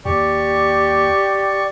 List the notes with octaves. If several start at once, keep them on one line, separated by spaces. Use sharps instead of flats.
D#2 G4 D5 C#6